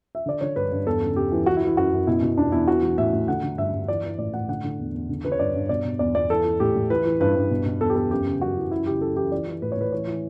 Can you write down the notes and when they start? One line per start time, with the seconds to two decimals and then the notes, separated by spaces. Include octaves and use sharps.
0.15 E5
0.26 D3 D5
0.41 D3 C#5
0.56 G2 B4
0.72 G2
0.87 E2 A4
1.02 C#3
1.16 E2 G4
1.32 E3
1.46 E3 F#4
1.57 E4
1.62 E3
1.67 E4
1.77 F#2 F#4
1.92 F#2
2.07 B2 E4
2.22 B2
2.37 E2 D4
2.52 E2 E4
2.68 E3 F#4
2.82 E3
2.98 A2 E5
3.13 A2
3.28 D3 F#5
3.43 D3
3.58 G2 E5
3.73 G2
3.88 E3 D5
4.03 E3
4.18 A2 D5
4.33 A2 F#5
4.49 D3 F#5
4.64 D3
4.80 E2
4.94 E2
5.09 D3
5.25 D3 B4
5.32 C#5
5.39 G2 D5
5.54 G2
5.69 B2 D5
5.85 B2
5.99 E2 D5
6.15 E2 D5
6.30 E3 A4
6.45 E3
6.60 A2 G4
6.75 A2
6.90 E3 B4
7.05 E3
7.20 G2 B4
7.36 G2
7.50 B2
7.66 B2
7.81 E2 A4
7.90 G4
7.96 E2 A4
8.11 F#2 G4
8.26 C#3
8.41 F#2 F#4
8.57 E3
8.71 F#2 E4
8.86 C#3 G4
9.01 F#2 A4
9.17 E3 G4
9.32 E3 D5
9.47 E3
9.62 A2 B4
9.72 C#5
9.77 A2 B4
9.92 E3 C#5
10.07 E3